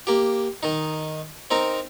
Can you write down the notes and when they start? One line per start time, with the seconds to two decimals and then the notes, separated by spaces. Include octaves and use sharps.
0.07 A#3 G4
0.63 D#3 D#4
1.51 C4 D#4 A#4